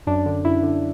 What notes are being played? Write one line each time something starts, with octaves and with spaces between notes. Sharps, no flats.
F#2 D4
D3
F#2 E4
D3